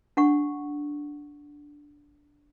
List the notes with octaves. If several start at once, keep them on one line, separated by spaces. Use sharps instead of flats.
D4 F#5 C#6